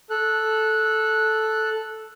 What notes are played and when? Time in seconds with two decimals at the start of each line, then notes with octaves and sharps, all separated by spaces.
0.10 A4 F#6